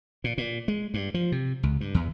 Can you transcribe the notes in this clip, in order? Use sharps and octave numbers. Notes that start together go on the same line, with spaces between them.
A#2
A#2
G#3
G2
F3
C3
C#2
G2
E2